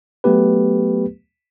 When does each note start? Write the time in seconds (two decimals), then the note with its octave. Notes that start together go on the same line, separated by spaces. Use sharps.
0.24 F#3 A3 B3 G4 B4